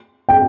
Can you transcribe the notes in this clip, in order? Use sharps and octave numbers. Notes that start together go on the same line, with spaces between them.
G5